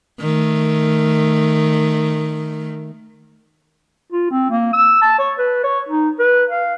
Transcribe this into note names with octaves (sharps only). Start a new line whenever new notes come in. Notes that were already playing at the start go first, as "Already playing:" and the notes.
D#3 A3
F4
C4
A#3
E6
A5
C#5
B4
C#5
D#4
B4
F5